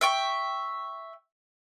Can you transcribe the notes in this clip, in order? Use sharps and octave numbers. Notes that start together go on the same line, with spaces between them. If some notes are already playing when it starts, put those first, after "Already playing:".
E5 G5 C#6